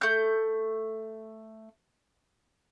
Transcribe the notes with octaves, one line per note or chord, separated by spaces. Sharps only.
A3 G6